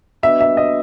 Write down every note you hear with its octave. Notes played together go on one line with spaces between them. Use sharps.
B3 D4 F#4 B4 D#5 E5
E5
D#5